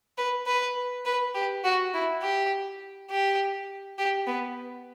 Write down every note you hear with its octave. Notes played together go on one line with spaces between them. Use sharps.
B4
B4
B4
G4
F#4
E4
G4
G4
G4
B3